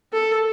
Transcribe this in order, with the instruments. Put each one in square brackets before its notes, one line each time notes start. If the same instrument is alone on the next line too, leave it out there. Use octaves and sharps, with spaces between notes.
[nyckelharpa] A4